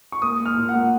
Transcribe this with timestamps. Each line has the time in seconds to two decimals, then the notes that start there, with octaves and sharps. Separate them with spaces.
0.12 C#6
0.22 A#3 D#6
0.40 A#3
0.46 F6
0.57 A#2
0.69 F#5
0.75 A#3